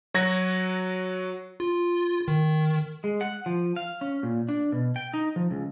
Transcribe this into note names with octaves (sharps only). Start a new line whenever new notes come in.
F#3 F#4 G#6 A#6
F4
D#3
G#3
F#5
F3
F5
C#4
A#2
D4
B2
G5
D#4
F3
C#2